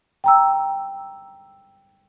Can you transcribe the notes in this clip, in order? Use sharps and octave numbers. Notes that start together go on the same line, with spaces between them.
G5 A#5 E6